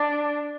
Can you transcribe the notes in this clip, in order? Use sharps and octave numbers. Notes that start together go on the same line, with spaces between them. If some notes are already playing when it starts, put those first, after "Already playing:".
Already playing: D4